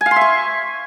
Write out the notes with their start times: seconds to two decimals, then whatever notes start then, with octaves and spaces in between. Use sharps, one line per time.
0.01 G#5
0.06 F5
0.11 C6
0.16 E5
0.21 C#6